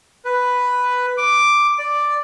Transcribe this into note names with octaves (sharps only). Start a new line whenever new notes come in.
B4
D6
D5